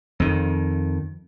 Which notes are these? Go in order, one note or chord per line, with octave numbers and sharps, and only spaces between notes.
F2 D#3